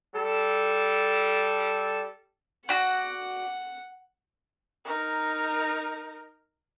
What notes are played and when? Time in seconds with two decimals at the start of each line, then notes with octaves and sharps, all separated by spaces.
0.14 G3 A4
2.69 F#4 D5 F#5
4.85 D#4 A#4